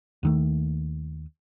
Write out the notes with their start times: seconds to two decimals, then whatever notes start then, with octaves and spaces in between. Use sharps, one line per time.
0.23 D#2 D#3 A3